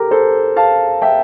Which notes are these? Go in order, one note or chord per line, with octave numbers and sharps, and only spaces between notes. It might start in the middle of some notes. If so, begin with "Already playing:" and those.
Already playing: G4 A4 A#4
A4 C5
F5 A5
E5 G5